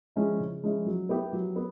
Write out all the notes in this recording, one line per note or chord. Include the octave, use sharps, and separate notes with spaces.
F3 G#3 C#4 E4
C#3
F3 G#3 C#4 E4
F#3
B3 E4 G4
F#3
B3